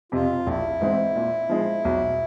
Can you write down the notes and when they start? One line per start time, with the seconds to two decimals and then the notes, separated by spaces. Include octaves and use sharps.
0.12 F2 C3 F4
0.46 A#1 E4
0.81 G#2 E3 G#3 C4
1.15 A#2
1.49 F3 G#3
1.85 B1